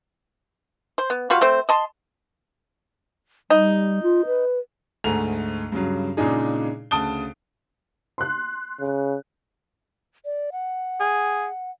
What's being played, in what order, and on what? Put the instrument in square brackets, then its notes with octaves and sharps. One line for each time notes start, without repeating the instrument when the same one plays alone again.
[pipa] C5
B3
G3 F4 F#4 F5
A3 C4 C5
D#5 A5 C6
[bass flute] G3 [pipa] D#4
[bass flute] F4
B4
[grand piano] D2 G#2 A3 G#4 A#5 F7
G2 C#3 F#3
A#2 C#3 G#3 D4 D#4 G#4
D2 C#3 A5 D#6 D7 G7
[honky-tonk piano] C6 F#6
[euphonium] C#3
[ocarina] D5
F#5
[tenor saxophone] G#4